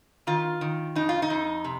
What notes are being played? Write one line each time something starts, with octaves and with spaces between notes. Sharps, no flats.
D#3 F4
D#3
F2 D#4
F4
D#4
F2
C3